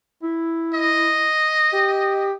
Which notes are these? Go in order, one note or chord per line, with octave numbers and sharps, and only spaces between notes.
E4
D#5
G4